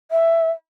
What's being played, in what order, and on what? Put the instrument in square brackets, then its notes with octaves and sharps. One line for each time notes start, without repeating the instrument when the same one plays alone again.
[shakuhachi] E5